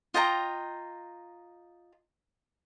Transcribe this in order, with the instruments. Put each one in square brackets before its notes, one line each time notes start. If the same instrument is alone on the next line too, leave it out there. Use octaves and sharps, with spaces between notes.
[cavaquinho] F4 D#5 G5 A#5